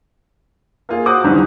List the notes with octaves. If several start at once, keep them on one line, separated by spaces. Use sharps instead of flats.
A#3 F4 G#4
F#4 C5 F#5 D6 D#6
E2 G#2 D3 D#3 F#3 G3